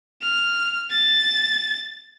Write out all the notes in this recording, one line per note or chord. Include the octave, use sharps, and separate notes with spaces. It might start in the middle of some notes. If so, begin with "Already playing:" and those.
F6
A6